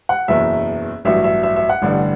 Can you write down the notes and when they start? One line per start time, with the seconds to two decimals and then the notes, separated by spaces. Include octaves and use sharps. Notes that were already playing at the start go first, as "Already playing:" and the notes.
0.09 F#5
0.28 F#1 E2 B2 E5
1.05 A1 G2 F#3 E5
1.24 E5
1.43 E5
1.56 E5
1.69 F#5
1.82 A1 G2 D3 G3